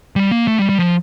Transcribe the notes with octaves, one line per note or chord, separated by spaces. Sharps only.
G3
A#3
A3
G3
G3
F3